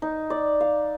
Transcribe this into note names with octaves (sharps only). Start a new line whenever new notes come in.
D#4
D5
F5